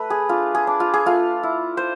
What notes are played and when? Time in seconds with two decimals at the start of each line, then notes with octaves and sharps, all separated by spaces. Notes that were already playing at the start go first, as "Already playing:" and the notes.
Already playing: A3 B4
0.10 G#4
0.29 D4 F4
0.55 G#4
0.67 D4
0.80 F4
0.94 G#4
1.06 A3 F4
1.43 E4
1.77 C5